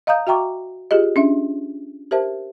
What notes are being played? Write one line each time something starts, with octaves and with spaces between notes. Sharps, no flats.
D#5 F5 A#5 D#6 G6
F#4 E5 G5 A#5 C#6 D6
F4 G4 G#4 D#5
C#4 D4 E5
G4 A#4 C5 E5 A5